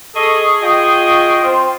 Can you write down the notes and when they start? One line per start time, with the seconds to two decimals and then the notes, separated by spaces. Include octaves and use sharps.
0.15 G#4 A4 D#5 C#6
0.62 F4 D#5 G5
1.43 C4 F4 C5